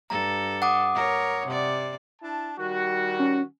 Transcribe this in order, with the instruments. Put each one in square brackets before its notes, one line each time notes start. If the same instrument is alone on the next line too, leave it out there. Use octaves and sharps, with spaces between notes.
[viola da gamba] G2 A4 [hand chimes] A#5
[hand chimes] F#5 D6 D#6
[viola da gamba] A#4 C#5
C3 D5
[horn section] D4 E4 A5
D#3 G3 F#4
[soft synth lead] C#4